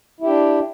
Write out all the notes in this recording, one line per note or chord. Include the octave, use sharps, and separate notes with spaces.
D4 E4 G4